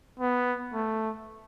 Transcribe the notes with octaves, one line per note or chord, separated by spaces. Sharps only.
B3
A3